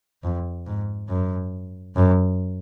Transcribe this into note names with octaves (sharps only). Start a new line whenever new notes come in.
F2
G#2
F#2
F#2